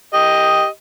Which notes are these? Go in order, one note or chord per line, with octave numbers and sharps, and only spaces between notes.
G4 D#5